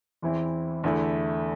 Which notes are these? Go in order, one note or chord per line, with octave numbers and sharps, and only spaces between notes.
E2 E3 C4 E4
E2 D3 A3 E4